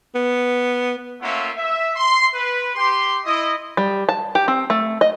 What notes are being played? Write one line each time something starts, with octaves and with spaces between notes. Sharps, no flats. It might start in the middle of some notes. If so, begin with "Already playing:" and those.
B3
A3 A#3 C#4 F4 E5 F#5
E5
C6
B4
G4 C6
E4 D#5
G3
A5
G4
C4
A3
D#5